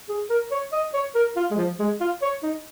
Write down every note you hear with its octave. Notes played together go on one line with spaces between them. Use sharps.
G#4
A#4
C#5
D#5
C#5
A#4
F4
G#3
F3
G#3
F4
C#5
D#4